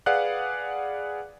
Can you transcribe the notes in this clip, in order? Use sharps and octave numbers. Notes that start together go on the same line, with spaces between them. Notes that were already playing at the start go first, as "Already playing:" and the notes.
G#4 B4 D5 F5 F#5 F#6